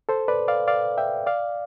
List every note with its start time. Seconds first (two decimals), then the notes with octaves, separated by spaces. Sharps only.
0.09 A4 C5
0.28 B4 D5
0.48 D5 F5
0.68 D5 F5
0.98 E5 G5
1.27 D5 F5